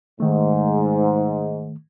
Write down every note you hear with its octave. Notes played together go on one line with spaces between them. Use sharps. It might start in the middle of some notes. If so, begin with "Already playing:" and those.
G#2 D#3 A3